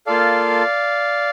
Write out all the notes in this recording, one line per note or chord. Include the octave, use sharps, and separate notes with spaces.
A#3 F4 A4 D5 F5